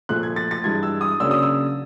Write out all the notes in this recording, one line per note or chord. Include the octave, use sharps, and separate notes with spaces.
A#2 F3 A3 F#6
G#6
A6
A6
G2 E3 G#3 G#6
E6
D#6
C#3 F#3 A#3 D4 E6
D#6
E6